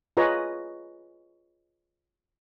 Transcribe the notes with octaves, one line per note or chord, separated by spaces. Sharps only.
F4 G#4 B4 C#5 D#5 A#5